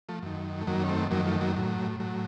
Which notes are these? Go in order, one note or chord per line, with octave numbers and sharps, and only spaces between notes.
F3 A3
F#2 D#3
A3
F#2 D#3 F#3 A#3
C#4
A3 C4
F#2 D#3 F#3 A#3
F3 A3
F#3 A#3
A2 F#3
A2 F#3